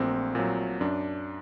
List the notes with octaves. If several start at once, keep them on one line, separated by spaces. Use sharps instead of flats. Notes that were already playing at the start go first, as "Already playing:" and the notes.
Already playing: A#1 A#2 F#3 A3 A#3 C4
A#2 F#3
F#2 D4